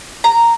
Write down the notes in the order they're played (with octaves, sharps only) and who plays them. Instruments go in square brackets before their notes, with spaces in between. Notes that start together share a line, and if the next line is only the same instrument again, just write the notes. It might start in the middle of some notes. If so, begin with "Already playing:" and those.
[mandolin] A#5